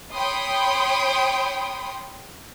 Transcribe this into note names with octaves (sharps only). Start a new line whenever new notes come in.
C#5 G5 B5 C6 D#6